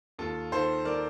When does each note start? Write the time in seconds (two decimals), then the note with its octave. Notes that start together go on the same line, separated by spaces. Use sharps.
0.19 D#2 F4 A4
0.52 D#3 A4 C5
0.85 A#4 D5